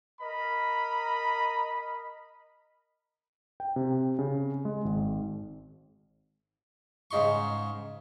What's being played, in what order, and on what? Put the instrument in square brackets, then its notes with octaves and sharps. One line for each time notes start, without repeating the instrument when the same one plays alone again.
[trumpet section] A#4 D#5 A#5 B5
[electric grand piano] G5
C3
C#3
G#3
G#1
[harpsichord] G#2 C#3 D#4 C6 C#6